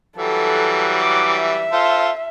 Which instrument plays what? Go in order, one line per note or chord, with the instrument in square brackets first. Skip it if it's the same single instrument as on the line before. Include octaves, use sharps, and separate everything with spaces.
[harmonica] E3 F#3 G3 [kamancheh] A4
[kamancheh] D6
E5
[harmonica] F4 A4 C5